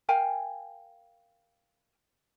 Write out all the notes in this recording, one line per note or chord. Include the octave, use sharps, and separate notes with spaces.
A#4 F5 G5 G#5